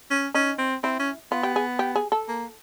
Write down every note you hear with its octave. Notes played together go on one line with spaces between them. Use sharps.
C#4
C#4 D#4
C4
C4 E4
C#4
B3 F4
G4
G#4
G4
G#4
A4
A#3